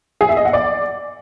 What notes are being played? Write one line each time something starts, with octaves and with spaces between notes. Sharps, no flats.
G#4
E5
D#5
F#5
D5